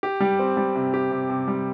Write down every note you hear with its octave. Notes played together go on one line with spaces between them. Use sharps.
G4
G3
C4
G3
C3
G4
C3
C3
G3